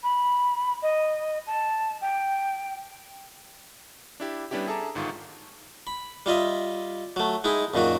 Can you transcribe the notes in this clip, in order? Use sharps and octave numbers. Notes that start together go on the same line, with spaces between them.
B5
D#5
A5
G5
D4 E4 G4
G3 B3 C#4 D4 E4 G4
G#4 A4 E5 A5 A#5 D6
G1 G#2 D#3 F4 C#6
B5
G3 F4 D#5 E5
F#3 A3
G#3 D#4 E4 G#4
F#2 A#2 D#3 F#3 F#4